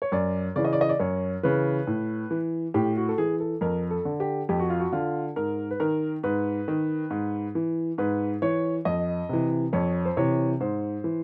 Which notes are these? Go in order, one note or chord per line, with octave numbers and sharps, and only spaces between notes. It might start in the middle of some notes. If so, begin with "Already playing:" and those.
C#5
F#2 D5
C#3 E3 D5
D#5
D5
D#5
D5
F#2 C#5
C#3 E3 B4
A2
E3
A2 G4
F#4
A4
E3 G#4
A4
F2 A#4
A4
D3
G4
F2 G4
F#4
F4
F#4
D3 F4
G#2 A#4
B4
D#3 A#4
G#2 B4
D#3
G#2
E3
G#2 B4
E3 C#5
F2 D#5
C3 E3
F2 C#5
C5
C3 E3 C#5
G#2 C5
E3